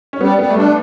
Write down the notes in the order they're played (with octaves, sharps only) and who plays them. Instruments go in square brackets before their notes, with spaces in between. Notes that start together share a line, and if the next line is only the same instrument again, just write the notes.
[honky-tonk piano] C#4
[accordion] G3 [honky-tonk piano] B3
[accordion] G3 [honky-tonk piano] B3
[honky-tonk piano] A3
[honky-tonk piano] G3 [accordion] D4